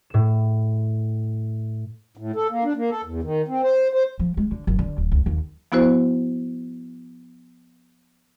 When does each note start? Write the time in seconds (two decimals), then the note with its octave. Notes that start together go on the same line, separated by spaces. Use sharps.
0.10 A2 E7
2.17 A2
2.36 A4
2.50 A#3
2.64 D4
2.77 A#3
2.91 A4
3.05 E2
3.23 D#3
3.48 C4
3.63 C5
3.93 C5
4.19 F3
4.37 G#3
4.51 D3
4.67 F#1
4.79 D3
4.98 D1
5.11 C#2
5.26 D#2
5.72 F3 B3 E4 F#4 C5